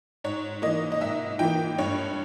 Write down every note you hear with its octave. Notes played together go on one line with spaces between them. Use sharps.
G#2 C#5
E3 A#3 D#5
D#5
G#2 E5
E3 A#3 G5
G2 C#5